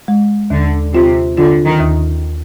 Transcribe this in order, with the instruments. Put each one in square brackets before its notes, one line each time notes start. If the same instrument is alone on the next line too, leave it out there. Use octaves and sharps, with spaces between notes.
[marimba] G#3
[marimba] D#2 [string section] D3
[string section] C3 [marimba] F4
[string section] D3 [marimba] F4
[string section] D#3
[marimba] D#2